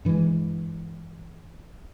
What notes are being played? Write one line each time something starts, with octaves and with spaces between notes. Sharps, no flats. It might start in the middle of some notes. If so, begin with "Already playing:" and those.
G2 E3 G#3